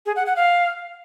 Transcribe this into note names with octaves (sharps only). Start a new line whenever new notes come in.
G#4
F#5
F#5
F5